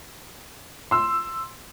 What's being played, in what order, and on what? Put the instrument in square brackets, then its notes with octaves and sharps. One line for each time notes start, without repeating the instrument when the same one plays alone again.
[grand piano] C6 E6